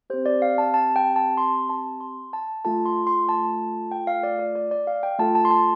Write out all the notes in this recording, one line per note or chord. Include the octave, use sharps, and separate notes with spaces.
C4 G4 C5
D5
F5
A5
A5
G5
A5
C6
A5
C6
A5
A3 F4 A4 A5
C6
C6
A5
G5
F5
D5
D5
D5
D5
F5
G5
A3 F4 A4 A5
A5
C6
A5